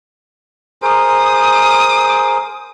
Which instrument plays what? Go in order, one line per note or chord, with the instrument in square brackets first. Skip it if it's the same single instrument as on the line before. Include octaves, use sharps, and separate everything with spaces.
[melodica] G#4 A#4 C5 [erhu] D#6